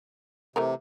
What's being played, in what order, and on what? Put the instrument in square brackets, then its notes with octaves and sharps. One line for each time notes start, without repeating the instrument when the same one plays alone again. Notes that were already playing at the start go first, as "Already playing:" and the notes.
[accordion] C3 [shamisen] E3 A3 A#4